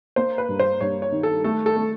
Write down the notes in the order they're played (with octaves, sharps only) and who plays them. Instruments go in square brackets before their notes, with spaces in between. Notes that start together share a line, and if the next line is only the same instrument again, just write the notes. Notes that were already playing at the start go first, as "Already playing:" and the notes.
[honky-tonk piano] A#3 [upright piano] C5
[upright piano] B4
[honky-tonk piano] G2
[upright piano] C5
[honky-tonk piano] G2 [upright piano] C#5
[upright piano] C#5
[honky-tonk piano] D#3
[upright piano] A4
[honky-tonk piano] A3 [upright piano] A4
[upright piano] A4
[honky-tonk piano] A3